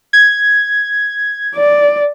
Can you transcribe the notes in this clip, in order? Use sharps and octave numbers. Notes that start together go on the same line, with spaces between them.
G#6
D5